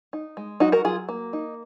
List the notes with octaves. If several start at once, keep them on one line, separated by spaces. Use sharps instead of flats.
D#4
G#3
F#3 D#4 F#4
F#4 A#4
F#3 F4 G#4
A#3
D#4